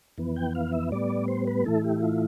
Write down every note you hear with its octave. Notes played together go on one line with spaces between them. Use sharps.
F2 E3 B3
G5
F5
E5
A2 G3 B3 D5
C5
B4
A2 E3 A3 E4 A4
G4
F4